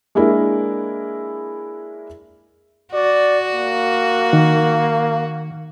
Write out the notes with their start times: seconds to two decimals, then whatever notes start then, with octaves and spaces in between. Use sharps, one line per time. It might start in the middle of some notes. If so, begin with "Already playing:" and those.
0.15 G#3 A#3 D4 E4 G#4 A#4
2.93 F#4 D5
3.54 A#3
4.33 D#3